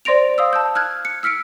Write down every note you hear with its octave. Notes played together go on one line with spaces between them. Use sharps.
C5 D5 C6 A#6 D7 F7
F5 D#6 E6
A5 E6 G6
F6 F#6 G#6
C#7
E6 F6 B6 C#7 D7